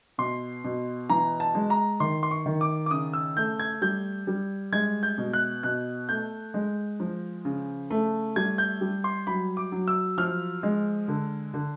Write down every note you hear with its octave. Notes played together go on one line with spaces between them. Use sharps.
B2 C6
B2
E3 A#5
A5
G#3
A#5
D#3 C6
C6
C#6
D#3
D6
D6
C#3 D#6
E6
A3 G6
G#6
G3 G6
G3
G#3 G#6
G6
B2
F#6
B2 F#6
A3 G6
G#3
F3
C#3
A3
G3 G#6
G6
G3
C6
F#3 B5
D6
F#3
E6
F3 F6
G#3
D3
D3